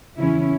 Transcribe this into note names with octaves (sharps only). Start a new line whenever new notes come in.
E2 C#3 E3 C#4 E4